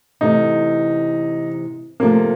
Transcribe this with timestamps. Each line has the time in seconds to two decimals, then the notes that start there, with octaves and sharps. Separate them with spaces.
0.21 C3 E3 A3 D#4
2.00 C3 F3 A3 A#3